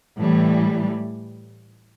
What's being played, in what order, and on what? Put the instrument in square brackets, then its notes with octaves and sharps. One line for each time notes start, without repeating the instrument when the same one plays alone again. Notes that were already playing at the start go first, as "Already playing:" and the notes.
[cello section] A2 E3 G3